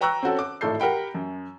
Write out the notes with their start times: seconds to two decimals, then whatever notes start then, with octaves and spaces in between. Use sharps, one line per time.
0.01 B4 G5 A#5 C#6 E6 F#6
0.23 C4 C#4 F#4 A4
0.39 D6
0.61 G#1 A2 A4 G6 C7
0.80 G4 A#4 F#5 G5 B5
1.14 F#2